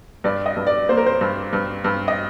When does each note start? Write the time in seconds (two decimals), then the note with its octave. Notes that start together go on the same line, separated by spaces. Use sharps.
0.24 G2 D5
0.46 D#5
0.56 G2
0.67 D5
0.89 A#3 C5
0.97 A#4
1.06 C5
1.21 G2
1.53 G2
1.84 G2
2.08 D#5